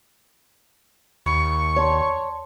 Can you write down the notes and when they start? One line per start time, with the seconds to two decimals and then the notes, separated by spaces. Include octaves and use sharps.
1.26 D#2 B5 C#6
1.76 C#5 D5 A5 C6